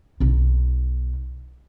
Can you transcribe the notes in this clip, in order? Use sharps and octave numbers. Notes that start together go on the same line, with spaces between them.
B1 D#4